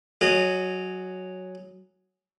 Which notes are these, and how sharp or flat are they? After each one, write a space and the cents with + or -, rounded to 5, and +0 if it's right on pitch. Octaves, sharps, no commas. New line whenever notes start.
F#3 +0 G#4 +0 D#5 -25